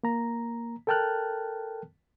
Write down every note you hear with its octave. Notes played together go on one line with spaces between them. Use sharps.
A#3 A#5
A4 A#4 G5 A5 F6 F#6